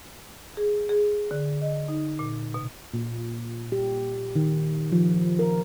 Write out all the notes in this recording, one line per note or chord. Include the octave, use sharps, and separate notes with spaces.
G#4
G#4
D3
D#5
D#4
A#2
B2
A#2
G4
D#3
F3
A#4